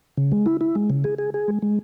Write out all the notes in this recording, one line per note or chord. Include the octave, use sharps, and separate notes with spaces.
C#3
G#3
E4
E4
G#3
C#3
G#4
G#4
G#4
G#3
G#3